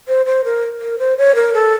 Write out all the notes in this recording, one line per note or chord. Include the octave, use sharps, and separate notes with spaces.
C5
C5
A#4
A#4
C5
C#5
A#4
A4